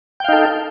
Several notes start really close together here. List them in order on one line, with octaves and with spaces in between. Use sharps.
G5 F5 D#4 A4